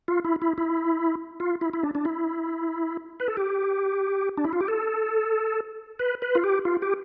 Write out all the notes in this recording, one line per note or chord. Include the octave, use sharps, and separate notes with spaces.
F4
E4
E4
E4
F4
E4
E4
D4
D4
E4
B4
A4
G4
D4
E4
F4
G4
A4
B4
B4
F4
G4
F4
G4